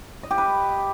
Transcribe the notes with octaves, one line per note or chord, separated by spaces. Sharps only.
D#5
G4
B4